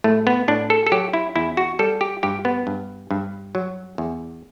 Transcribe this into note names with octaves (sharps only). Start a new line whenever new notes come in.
A2 A3
B3
A2 D4
A4
A4
F#3 G4
E4
E2 E4
F#4
G3 A4
G4
G2 G4
B3
G2
G2
F#3
E2